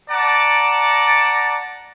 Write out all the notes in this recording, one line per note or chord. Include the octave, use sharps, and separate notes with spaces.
D5 F#5 A5 A#5 D6